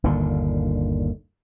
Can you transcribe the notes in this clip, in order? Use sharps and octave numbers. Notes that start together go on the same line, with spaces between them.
G1 D#2 A#2 D3